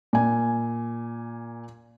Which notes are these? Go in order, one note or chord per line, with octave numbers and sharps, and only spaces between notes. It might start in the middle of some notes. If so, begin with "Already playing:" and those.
A#2 G#5